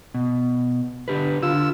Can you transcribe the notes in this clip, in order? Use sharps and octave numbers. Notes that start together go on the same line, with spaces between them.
B2
D3 G4 B4
D3 F4 E6